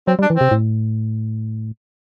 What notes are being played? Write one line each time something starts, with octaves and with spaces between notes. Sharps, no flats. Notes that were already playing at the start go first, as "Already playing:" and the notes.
F#3 C4
G3
D4
E3
C3 C4
A2